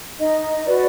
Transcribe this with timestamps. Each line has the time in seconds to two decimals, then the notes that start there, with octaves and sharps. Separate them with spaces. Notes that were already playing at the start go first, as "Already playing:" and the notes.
0.19 D#4 D#5
0.66 F#4 B4 D5